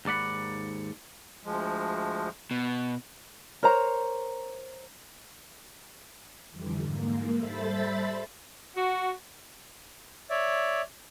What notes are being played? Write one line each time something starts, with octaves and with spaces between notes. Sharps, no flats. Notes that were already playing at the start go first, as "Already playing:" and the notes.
D#2 G#2 D5 F#5 B5
D2 F3 G#3
B2
A#4 C5 C#5 A#5
F2 D3 E3 G3
G#2 A#3
G3 A4 C5 E5 B5 A6
F#4
C#5 D5 E5